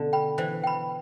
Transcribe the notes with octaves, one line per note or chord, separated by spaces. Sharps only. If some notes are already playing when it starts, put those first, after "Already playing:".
Already playing: B2 D3
G5 B5
E3 C5
G5 B5